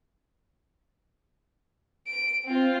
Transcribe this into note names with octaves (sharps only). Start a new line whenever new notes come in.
D7
C4 F4